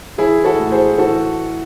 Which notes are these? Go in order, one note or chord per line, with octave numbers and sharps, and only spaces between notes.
E3 E4 G#4
F#4 A4
A2
G#4 C5
E3 F#4 A4